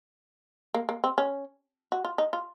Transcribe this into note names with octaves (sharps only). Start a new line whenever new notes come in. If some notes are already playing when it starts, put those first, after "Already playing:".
A#3
A#3
C4
C#4
F#4
F4
D#4
F4